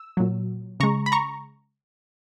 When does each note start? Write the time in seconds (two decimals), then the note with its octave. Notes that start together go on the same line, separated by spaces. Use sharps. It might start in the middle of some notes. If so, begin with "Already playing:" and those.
Already playing: E6
0.17 A#2 F#3
0.80 C#3 G#3 A#5 C#6
1.06 B5
1.12 A#5 C#6